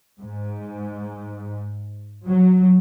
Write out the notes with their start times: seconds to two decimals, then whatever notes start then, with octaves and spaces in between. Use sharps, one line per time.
0.19 G#2
2.26 F#3